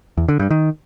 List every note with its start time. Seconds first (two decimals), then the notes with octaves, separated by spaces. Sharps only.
0.17 E2
0.28 D3
0.40 G2
0.51 D#3